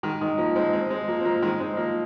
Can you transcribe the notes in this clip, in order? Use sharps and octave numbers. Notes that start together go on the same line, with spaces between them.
D#3 G#3
D#3 G#3
F3 A#3
G#3 C4
G#3 C4
G#3 C4
F3 A#3
C4
F3 A#3
D#3 G#3
G#3 C4
F3 A#3